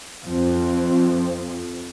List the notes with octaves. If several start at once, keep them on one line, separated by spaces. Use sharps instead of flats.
F2 F3 C4